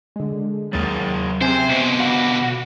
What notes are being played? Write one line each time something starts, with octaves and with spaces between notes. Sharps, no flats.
D3 G#3
D#2 F#3 G#4 A#4 A6
C3 C4 C5 G#5
B2 D3
F#4 F5 B5 D6